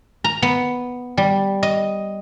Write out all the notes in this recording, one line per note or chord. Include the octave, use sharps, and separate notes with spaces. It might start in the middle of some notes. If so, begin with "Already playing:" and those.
A#5
B3
G3
D#5